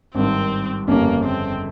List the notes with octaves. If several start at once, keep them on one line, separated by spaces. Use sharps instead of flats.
G#1 G2 D#3 C4
G1 F2 C#3 G3 A#3 C#4
C4